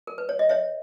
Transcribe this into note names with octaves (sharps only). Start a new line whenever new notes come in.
A#4
B4
C#5
D#5
C#5 E5